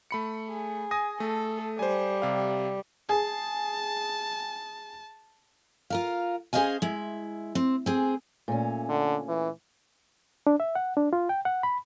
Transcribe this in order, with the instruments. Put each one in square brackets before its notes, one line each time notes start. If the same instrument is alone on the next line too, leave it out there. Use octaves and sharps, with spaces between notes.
[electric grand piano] A3 B5 C#7
[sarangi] G#4
[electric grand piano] G#5 D#6 A#6
[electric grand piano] A3 [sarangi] A4
[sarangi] G3 [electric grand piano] C5 G#5
[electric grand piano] C3 F5
[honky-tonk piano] G#4 [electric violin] A5
[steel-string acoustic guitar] F4 A#4 F5
C#4 G#4 C5 D#5 F5 G#5
G#3 E4
C4
C4 G#4
A#2 A3 C#4
[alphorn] D3
E3
[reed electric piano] D4
E5
F#5
D4
F4
G5
F#5
B5